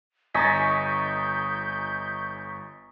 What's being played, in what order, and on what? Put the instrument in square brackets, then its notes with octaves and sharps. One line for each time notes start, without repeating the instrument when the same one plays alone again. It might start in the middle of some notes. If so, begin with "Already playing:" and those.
[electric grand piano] G1 A6 [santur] D#5 G#5 [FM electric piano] A#5 C#6 B6 [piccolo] G6